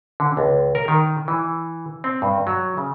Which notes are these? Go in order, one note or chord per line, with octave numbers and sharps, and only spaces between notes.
D3
C#2
A#4
D#3
E3
C4
G2
F#3
C#3